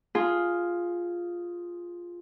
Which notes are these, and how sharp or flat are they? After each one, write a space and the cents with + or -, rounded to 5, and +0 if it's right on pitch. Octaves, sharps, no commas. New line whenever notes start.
F4 +0 G#4 +0